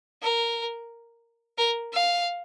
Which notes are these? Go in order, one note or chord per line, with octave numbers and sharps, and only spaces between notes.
A#4
A#4
F5